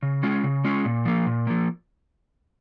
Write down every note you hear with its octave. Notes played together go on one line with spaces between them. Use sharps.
C#3
G#3 C#4 F4
C#3
G#3 C#4 F4
A#2
F3 A#3
A#2
F3 A#3